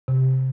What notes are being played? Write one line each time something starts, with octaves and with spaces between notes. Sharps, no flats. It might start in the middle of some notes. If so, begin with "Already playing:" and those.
C3